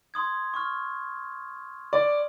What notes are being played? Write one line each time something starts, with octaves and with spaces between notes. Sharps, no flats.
C6 D#6 G#6
C#6 F6
D5